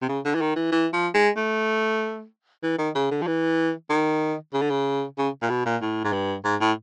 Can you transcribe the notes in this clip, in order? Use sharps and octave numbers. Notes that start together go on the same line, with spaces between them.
C3
C#3
D3
E3
D#3
E3
E3
F3
G#3
A3
E3
D#3
C#3
D3
F3
E3
D#3
C#3
D3
C#3
C#3
A#2
B2
A#2
A2
G#2
G2
G#2
A2